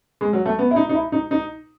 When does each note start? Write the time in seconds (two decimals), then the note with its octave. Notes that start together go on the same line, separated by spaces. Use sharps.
0.21 G#3
0.33 F#3
0.46 A3
0.59 B3
0.71 E4
0.76 D#4
0.89 D#4
0.95 E4
1.12 D#4
1.31 D#4